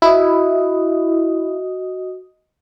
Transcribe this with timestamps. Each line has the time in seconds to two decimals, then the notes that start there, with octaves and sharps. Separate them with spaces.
0.02 E4 F#4 D#5 D#6